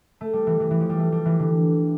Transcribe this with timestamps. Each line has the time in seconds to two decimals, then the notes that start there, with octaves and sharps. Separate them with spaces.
0.21 A3
0.33 G3
0.47 E3
0.60 E3
0.71 E3
0.80 F3
0.89 G3
1.00 A3
1.12 G3
1.25 E3
1.39 D3